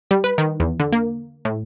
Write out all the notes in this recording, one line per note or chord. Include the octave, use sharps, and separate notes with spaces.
G3
B4
D#3
E2
D3
A#3
A2